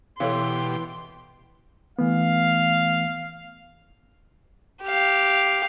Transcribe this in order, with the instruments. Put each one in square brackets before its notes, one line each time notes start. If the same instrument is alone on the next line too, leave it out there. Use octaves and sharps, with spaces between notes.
[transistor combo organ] B2 G4 [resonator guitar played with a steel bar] E3 [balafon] A4 C#5 F5 [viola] C6
[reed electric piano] E3 A3 B3 [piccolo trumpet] F5
[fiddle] G4 F5